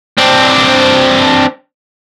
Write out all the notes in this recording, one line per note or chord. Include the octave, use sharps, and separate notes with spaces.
C4 D4